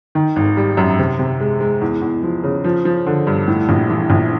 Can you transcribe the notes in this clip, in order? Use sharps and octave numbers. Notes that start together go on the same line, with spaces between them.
D#3
G#1
G3
F#2
C3
C3
G#3
G#3
E2
E2
F3
C#3
F3
F3
D3
G2
A2
A#1
E3
A#1